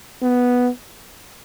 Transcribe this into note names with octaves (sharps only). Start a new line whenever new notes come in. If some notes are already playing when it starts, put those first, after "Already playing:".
B3